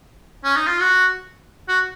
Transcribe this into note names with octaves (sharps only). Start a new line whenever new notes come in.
C#4
D#4
F4
F#4
F#4